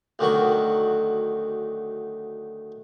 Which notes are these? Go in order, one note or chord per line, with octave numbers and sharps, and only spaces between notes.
D2 D#3 F#3 C#6